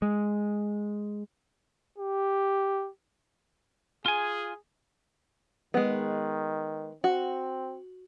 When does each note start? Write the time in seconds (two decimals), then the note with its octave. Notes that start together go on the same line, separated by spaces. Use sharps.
0.02 G#3
1.98 G4
4.06 F4 G#4 G#5
5.74 D#3 G#3 B3
7.04 C4 F#4